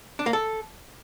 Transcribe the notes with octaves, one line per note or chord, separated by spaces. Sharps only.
D4
A#3
A4